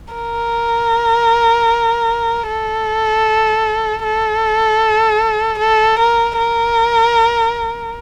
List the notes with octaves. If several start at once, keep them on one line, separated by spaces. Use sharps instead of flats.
A#4
A4
A4
A4
A#4
A#4